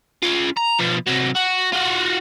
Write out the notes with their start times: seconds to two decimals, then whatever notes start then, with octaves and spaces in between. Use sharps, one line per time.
0.23 C#4 F4
0.57 A#5
0.79 B2 F3
1.07 C3 F#3
1.36 F#4
1.73 F4 F#4